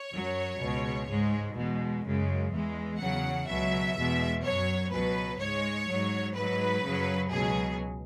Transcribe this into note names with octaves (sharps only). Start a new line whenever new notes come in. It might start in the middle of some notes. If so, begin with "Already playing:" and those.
Already playing: C#5
F#2 F#3
C#2 B2 G#3
G#2 G#3
E2 B2 G#3
F#2 C#3 G#3
E2 E3 G#3
E2 C#3 F#3 F#5
C#2 B2 F#3 E5
E2 B2 G#3
F#2 F#3 C#5
C#2 B2 F#3 B4
G#2 G#3 C#5
G#2 F#3
G#2 F#3 B4
F#2 C#3 F#3
C#2 B2 F#3 G#4